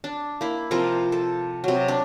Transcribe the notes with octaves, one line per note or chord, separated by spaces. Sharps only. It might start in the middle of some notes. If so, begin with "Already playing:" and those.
D4
A#3 E4
C3 F3 F4 A#4
A4
C3 F#3
D4